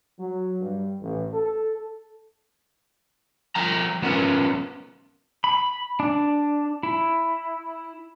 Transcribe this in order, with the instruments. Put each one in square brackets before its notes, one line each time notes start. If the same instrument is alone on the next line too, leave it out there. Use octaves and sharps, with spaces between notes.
[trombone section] F#3
G2
A1
A4
[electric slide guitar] F3 G5 A#5
F3 B3 C#4 A#4
[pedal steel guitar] B5
D4
E4